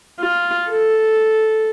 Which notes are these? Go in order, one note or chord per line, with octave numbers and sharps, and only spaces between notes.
F4
A4